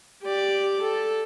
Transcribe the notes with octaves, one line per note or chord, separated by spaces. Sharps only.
G4 D5
A4